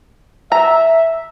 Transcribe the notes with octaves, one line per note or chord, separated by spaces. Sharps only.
E5 A#5